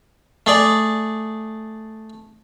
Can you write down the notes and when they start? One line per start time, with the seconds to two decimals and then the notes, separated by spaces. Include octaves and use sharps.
0.46 A3 G#4 D5